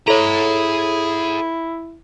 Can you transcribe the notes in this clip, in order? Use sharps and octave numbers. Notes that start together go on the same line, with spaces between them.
E4 G#4 A4 C#5 A#5